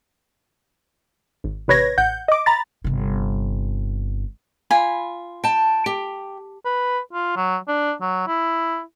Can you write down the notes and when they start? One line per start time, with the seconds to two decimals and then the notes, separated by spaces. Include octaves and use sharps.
1.44 G#1
1.68 A1 C3 B4 C#5 G#6 A#6
1.98 A1 F#5 G6
2.28 D#5 D6
2.46 A#5 B5 A6
2.84 G1 C3
4.71 F4 G#5 B5
5.44 G5 A5
5.86 G4
6.65 B4
7.13 F4
7.36 F#3
7.68 D4
8.01 F#3
8.28 E4